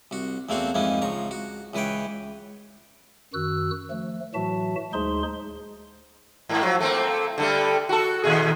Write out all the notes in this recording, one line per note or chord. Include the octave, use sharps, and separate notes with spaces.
C2 F#4
E2 A3 A#3 C4 F#4 C5
F2 G#2 E3 A#3 C#4 D#4
C#2 F3 A#5 C#6
F#4
C#2 E3 B4 C#5 G5
F#2 D#3 F#4 E6 F#6
F3 A3
A2 E3 F#3 F#4 E5 A5
D2 G#3 D#4 G#4 C5 C6
G#2 A#3
F3 F#3
A3 A#3 C4
D3 G3 A3
F#4 A4
D#2 A#2 G#4